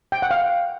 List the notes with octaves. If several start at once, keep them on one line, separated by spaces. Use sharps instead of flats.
G5
F#5
F5